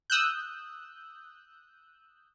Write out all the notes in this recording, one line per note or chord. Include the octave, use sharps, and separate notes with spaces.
D#6 E6 F#6 G6